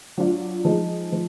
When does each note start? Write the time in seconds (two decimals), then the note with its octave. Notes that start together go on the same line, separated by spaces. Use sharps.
0.18 F#3 D4 F4
0.65 F3 G#3 D#4
1.12 F3